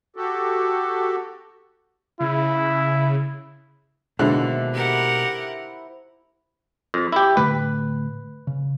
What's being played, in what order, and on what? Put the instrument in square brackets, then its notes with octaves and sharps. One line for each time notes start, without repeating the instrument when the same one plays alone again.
[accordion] F#4 G4 A4
[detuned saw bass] C#3 [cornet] E4
[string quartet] D#2 [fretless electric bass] B2 G#3 [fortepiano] D3 [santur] E4 C5 C6
[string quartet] G4 A#4 F#5
[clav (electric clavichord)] F2
E4 G4
[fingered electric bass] A2 D3 A3 [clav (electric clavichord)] B4
[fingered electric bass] C#3